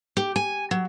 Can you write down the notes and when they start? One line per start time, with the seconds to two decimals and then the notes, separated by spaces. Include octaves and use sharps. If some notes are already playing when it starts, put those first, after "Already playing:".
0.17 G4
0.36 G#5
0.71 F#3